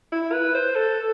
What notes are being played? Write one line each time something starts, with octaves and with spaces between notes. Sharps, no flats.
E4
B4
C5
A4